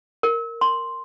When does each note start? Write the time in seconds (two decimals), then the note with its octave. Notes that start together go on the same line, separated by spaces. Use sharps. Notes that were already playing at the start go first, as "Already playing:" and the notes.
0.23 A#4
0.61 C6